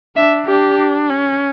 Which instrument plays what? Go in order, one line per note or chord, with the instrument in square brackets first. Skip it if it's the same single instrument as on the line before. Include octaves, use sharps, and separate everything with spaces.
[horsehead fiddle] D4 [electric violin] E5
[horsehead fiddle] D4 [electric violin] G4
[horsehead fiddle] C#4